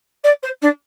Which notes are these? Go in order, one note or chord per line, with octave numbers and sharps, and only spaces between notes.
D5
C5
D4